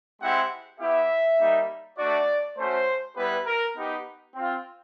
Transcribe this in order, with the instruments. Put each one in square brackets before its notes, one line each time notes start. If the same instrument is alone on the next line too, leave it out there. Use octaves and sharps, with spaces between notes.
[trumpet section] G#3 C4 E4 G4 F#5
B3 E4 G4 E5
G3 A#3 D#4
A3 D4 F#4 D5
A3 C#4 F#4 C5
G3 B3 E4 G4 B4
A#4
B3 D#4 G4
C4 F4